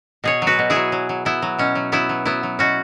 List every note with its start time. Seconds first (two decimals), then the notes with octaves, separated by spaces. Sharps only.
0.24 B2 G#4 C#5
0.42 F#3
0.47 F#4 B4
0.59 B2
0.70 E4 G#4
0.76 F#3
0.92 F#3
1.09 F#3
1.25 F#3 B3 E4
1.42 F#3
1.58 B2 C#4
1.75 F#3
1.92 F#3 B3 E4
2.09 F#3
2.25 F#3 B3 E4
2.43 F#3
2.59 B2 C#4 F#4